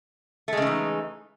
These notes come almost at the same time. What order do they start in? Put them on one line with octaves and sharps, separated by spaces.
A3 G#3 C#3 E3 D#4